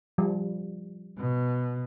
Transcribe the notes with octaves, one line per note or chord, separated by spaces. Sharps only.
F3 G3
B2